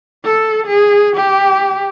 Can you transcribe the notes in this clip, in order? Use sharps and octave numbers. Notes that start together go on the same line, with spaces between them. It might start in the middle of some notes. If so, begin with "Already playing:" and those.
A4
G#4
G4